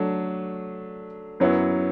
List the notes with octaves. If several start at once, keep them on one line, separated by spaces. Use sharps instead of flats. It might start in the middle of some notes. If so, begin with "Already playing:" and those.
Already playing: F#3 A3 D4
F#2 F#3 B3 E4